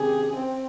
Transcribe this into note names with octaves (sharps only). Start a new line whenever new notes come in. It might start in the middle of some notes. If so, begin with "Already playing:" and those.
Already playing: C3 D#3 G#3 C#4 G4 G#4
C4